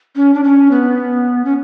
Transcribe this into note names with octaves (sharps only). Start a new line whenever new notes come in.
C#4
D4
C#4
B3
C#4